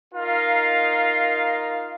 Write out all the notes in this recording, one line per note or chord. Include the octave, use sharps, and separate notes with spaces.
D#4 F4 A#4 F5